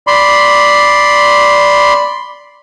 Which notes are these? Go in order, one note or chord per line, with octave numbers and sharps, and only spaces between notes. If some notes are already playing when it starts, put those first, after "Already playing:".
D5 B5 C6